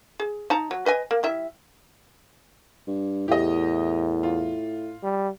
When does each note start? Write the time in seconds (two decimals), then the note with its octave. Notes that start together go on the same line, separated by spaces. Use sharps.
0.20 G#4
0.50 D#4 A5 A#5
0.71 F#3
0.86 B4 D#5 G#5
1.11 A#3
1.23 G3 E4 E5
2.87 G2
3.28 E2 A2 G4 D#5
4.23 F4
5.03 G3